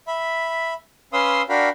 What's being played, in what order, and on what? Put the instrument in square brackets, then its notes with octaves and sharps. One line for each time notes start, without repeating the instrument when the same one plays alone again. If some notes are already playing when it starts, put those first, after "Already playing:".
[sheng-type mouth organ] E5 B5
C#4 B4 F5 C6 D#6 E6
D4 F#4 A#4 F5 G5 B5